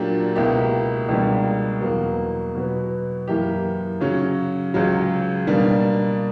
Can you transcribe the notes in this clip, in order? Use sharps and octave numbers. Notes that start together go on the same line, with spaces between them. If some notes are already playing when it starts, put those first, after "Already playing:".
Already playing: A#2 F#3 A#3 D4 G4
C#2 B2 A#3 E4 G4
C#2 B2 G3 A#3 D4
E2 B2 F#3 A#3
B2 F#3 B3
F#2 E3 A#3 E4 G4
C#3 F#3 C#4
C#2 C#3 F#3
B2 G3 A#3 D4